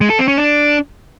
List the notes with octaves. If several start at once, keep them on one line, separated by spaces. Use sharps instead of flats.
G#3
A4
C4
C#4
D4